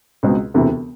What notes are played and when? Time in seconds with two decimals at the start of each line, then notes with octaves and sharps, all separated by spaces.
0.23 C#2 B2 G#3 C4
0.54 E1 D2 C3 E3